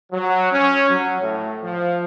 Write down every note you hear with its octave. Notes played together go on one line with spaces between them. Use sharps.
F#3
C#4
F#3
A2
F3